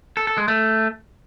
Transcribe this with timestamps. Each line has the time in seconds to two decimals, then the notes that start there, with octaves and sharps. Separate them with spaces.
0.17 A4
0.27 A4
0.38 G#3
0.48 A3